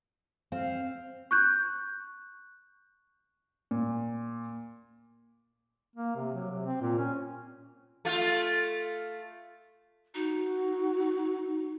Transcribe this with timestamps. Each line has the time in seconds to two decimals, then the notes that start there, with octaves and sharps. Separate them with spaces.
0.52 C4 F5
1.31 C#6 F#6 G6
3.71 A#2
5.96 A#3
6.16 C3
6.34 F#3
6.50 C3
6.66 C4
6.82 A#2
6.98 C#4
8.05 A3 F4
10.15 D#4 F#4